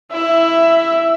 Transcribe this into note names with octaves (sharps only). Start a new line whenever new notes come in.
E4 E5